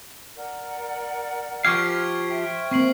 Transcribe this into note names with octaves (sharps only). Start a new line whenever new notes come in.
A#4 D5 F#5
F3 G4 F5 C#6 F6 G#6
C5 E5 G5
A#3 C4 C#6 C7 F#7